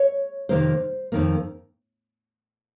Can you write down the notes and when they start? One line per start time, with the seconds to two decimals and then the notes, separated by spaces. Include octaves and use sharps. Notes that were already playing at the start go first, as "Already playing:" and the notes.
Already playing: C#5
0.49 F2 C3 D#3 A#3 C5
1.12 F2 D#3 A#3